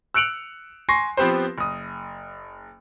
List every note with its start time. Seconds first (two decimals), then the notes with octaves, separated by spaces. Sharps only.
0.14 E6 F#6 C#7 D7 F7 F#7
0.89 G#5 C6 C#6 A#6 C7
1.17 F3 B3 C4 G4 B4 C5
1.58 F#1 D#6